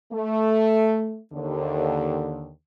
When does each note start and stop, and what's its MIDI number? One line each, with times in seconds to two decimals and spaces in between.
0.12 1.19 57
1.32 2.50 39
1.32 2.50 50